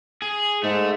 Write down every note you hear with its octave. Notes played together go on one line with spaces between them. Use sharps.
G#4
G#2 A3